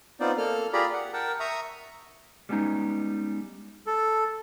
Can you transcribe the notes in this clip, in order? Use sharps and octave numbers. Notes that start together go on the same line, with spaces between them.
B3 C4 D#4 F4 C5 D5
A#3 A4 F6
F4 G4 G#4 D5 A#5 B5
F#5
A#4 F#5 G5 A5
E5 A#5 C#6 D#6
G3 G#3 B3 C#4 D#4
A4